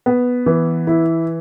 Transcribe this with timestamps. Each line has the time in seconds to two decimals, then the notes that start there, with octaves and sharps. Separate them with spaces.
0.06 B3
0.46 E3
0.87 E4